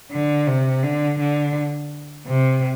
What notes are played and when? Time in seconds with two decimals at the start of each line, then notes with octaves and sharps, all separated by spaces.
0.12 D3
0.47 C3
0.83 D3
1.20 D3
2.27 C3